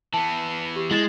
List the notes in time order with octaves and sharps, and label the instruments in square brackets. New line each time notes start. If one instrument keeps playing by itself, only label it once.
[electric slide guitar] E3 B3 [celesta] A5
[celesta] G4
[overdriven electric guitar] G#3 [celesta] E4 A6 E7